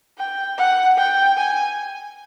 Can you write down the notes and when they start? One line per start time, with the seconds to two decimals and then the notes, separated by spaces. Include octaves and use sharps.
0.18 G5
0.58 F#5
0.97 G5
1.37 G#5